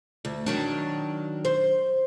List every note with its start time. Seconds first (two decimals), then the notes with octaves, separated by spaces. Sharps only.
0.25 D2
0.46 D#3 F#3 D4
1.45 C5